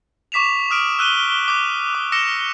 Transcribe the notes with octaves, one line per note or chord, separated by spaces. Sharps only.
C#6 D6 B6 E7 F7
D#6 F6 D7
E6 F#6 D#7 G7
D6 F#6
D6
D6 E6 A#6 C#7 E7